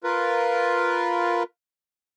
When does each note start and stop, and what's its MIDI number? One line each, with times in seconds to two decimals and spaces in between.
0.04 1.43 65
0.04 1.43 70
0.04 1.43 71